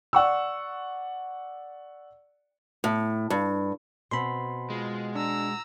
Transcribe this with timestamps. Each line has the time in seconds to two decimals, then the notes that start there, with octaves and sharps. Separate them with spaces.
0.13 D5 F#5 C#6 E6
2.84 A2
3.30 G2
4.11 B2 C4 B5 C6
4.70 G#3 F4
5.15 D4 A#5 E6